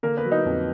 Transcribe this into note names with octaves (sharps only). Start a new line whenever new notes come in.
D3 A#3 A#4
B3 B4
F#3
D#4 D#5
F2